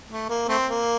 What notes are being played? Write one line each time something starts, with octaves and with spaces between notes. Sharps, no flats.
A3
A#3
A3 C4
A#3